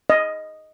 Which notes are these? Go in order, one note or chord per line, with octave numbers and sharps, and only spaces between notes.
D#5